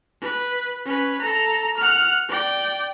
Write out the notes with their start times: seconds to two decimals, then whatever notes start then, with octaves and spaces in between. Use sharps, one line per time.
0.21 B4
0.85 C#4 B4
1.21 A4 A#5
1.77 F#5 F6
2.28 D5 G5